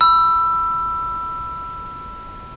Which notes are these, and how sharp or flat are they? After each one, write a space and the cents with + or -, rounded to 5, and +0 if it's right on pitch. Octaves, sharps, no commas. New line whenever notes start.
B5 +0 E6 +20